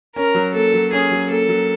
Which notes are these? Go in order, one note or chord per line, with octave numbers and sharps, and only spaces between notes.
C#4 A#4
F#3
A#3 A4
F#3
C#4 G#4
F#3
A#3 A4
F#3